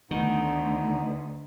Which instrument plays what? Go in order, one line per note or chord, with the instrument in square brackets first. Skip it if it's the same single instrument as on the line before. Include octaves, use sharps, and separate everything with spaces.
[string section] D2 [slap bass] D#3 [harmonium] B3 D#4